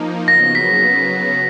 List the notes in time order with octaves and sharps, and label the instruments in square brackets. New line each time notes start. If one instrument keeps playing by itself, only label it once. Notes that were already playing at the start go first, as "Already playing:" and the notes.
Already playing: [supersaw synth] F3 A#3 D#4
[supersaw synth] C#3 F#3 B3 [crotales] A#6
[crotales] B6